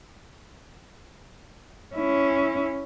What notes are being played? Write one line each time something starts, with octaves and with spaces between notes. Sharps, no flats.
C#4 E4